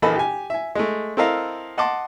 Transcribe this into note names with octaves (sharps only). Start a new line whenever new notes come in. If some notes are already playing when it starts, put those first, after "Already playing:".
A#1 E3 A#3 A4 D#5 B5
G4 G#5
E5 G#5
G#3 A3
C4 E4 A4 A#4 D#5 F5
D#5 F#5 A5 C6 D6